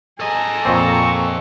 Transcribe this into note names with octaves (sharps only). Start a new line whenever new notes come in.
G#4 A4 D#5 A#5
F2 A#2 C4 C#6